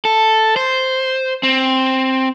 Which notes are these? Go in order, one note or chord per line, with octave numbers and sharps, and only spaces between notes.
A4
C5
C4